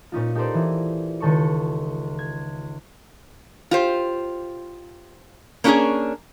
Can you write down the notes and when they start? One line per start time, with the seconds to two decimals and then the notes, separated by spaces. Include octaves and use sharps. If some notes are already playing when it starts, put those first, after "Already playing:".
0.12 A#2 C#4 D#4 F4
0.35 D#4 G4 A4 A#4 C5 D5
0.54 E3 E6
1.20 C#2 D#3 A4 C#5 C#6
2.19 G#6
3.71 F4 G4 C5
5.64 A#3 C#4 D4 G4 G#4 A#4